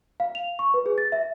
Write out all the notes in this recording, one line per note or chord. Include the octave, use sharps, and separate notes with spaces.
F5
F7
C#6
B4
G#4
A6
E5